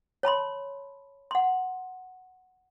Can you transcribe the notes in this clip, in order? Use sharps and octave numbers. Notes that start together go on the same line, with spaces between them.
C#5 A5 B5 C6
F#5 C6